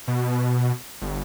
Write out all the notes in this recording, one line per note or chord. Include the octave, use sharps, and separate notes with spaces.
B2
G1